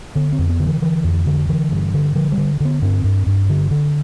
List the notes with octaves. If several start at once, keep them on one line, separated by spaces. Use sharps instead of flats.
D3 B3
C4
F2
B3
D3
E3
D3 E3
F2
D3
D3 E3
G2
D3
D3 F3
G3
D3
D3 B3
G2 C4
G2
G2
D3
D3